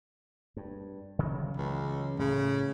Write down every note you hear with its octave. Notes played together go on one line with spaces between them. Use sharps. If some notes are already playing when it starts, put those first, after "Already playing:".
G2
C#3 E3 F#3
C#2
A2 C#3